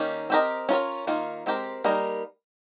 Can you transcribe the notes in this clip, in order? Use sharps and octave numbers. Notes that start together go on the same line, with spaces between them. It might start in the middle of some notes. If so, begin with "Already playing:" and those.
Already playing: D#3 A#3 C#4 G4
C4 G4 A#4 D#5
C#4 F4 A#4 C#5
D#3 A#3 F4
G#3 C4 G4 A#4
G3 A#3 D#4 A#4